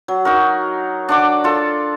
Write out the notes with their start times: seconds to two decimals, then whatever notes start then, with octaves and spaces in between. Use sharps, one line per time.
0.08 F#3
0.25 D#4 F#4 A#4
1.09 D4 F#5 D6
1.44 F4 A4